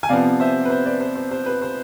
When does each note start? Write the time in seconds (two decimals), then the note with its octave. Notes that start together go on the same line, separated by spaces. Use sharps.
0.03 G#5
0.09 C3 F3 B3 D5 F5
0.40 C5 E5
0.65 B4
0.70 C5
0.86 B4 D5
1.01 C5
1.16 C5
1.31 C5
1.46 B4
1.62 C5